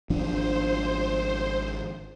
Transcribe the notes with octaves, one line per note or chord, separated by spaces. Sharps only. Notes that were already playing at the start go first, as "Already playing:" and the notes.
G#1 F3 D4 C5